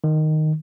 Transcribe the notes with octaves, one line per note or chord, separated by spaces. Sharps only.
D#3